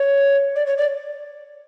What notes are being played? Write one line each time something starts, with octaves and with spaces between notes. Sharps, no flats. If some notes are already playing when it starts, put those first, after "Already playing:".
Already playing: C#5
D5
C#5
D5